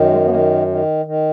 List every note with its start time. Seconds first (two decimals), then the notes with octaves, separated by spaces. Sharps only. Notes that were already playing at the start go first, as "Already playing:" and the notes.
Already playing: F#2 D#3
0.11 G#3
0.25 B3
0.30 D#3 A#3
0.67 D#3
1.05 D#3